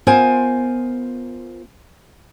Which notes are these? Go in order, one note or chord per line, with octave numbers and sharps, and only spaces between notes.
B3 F4 A#4 C5 F5 G#5